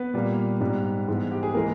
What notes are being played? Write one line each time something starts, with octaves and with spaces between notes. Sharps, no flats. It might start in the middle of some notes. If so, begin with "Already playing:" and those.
Already playing: B3 B4
A#2 G3 A#3
G#2 G3 B3
G#2 E3 G#3 B3
G4
G#4
E3 G#3 A#3 A#4